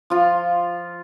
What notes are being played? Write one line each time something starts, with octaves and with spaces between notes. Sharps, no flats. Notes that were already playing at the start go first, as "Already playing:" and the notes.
F3 F4